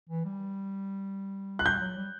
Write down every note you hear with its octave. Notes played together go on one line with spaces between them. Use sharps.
E3
G3
F#6
G3 G6
F#3
G3